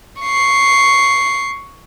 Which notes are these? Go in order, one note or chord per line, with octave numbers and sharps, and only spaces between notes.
C#6 C7